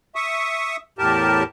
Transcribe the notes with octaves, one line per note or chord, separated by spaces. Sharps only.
E5 C#6 D#6
E2 A2 G4 A#4 A5